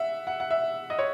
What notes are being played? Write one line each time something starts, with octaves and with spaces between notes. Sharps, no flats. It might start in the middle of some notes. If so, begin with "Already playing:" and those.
Already playing: E5 F#5
F#5
F#5
E5
D#5
C#5